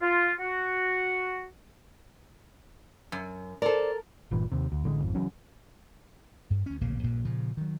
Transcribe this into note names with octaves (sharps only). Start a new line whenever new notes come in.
F4
F#4
F#2
A4 A#4 C5 D5
G1 A#2 E3
D#2 C3
D2
A1 D3 G3 G#3
G#1 F2
C#3 E3 F#3 C#4
G2
D2 C#4
D1 A#1 C#3 A#3
A#1 G2 A#2
A#2 C#3 F3
D#3 F#3